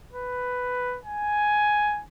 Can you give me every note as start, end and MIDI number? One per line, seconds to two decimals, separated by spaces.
0.12 0.99 71
1.05 2.02 80